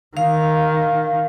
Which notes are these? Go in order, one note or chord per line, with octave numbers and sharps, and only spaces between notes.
D#3 F5